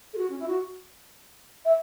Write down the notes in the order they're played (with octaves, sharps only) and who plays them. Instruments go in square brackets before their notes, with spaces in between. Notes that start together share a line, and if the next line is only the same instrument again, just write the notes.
[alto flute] A4
F#4
C#4
E4
F#4
E5